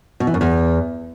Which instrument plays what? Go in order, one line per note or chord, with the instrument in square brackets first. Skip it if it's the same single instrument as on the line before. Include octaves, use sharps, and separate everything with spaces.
[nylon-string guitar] B2
E3
F#2
E2